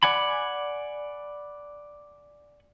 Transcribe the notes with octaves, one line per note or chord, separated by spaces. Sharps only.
D5 F#5 G#5 B5